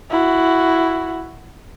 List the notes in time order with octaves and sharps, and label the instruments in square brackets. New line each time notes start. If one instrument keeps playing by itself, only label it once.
[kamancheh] E4 F#4